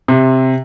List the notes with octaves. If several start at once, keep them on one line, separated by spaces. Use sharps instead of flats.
C3